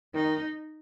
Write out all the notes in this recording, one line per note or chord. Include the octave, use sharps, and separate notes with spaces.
D#3 D#4